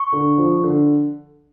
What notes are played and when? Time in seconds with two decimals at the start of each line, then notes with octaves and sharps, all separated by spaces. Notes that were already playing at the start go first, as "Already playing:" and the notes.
Already playing: C#6
0.13 D3
0.38 F3
0.63 D3